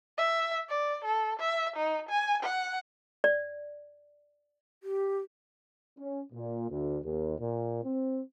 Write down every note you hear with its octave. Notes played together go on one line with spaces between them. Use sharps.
E5
D5
A4
E5
D#4
G#5
F#5
D5
G4
C#4
A#2
D2
D#2
A#2
C4